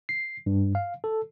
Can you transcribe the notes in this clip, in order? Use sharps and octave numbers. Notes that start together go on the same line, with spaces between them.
C7
G2
F5
A4